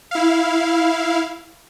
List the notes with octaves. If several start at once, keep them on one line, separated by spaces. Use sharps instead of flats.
E4 F5